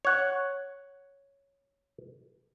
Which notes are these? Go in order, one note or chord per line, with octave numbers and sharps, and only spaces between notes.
C#5 F#5